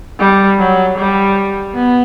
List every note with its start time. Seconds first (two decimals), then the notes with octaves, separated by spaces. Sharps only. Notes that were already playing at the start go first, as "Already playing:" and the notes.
0.19 G3
0.58 F#3
0.97 G3
1.74 B3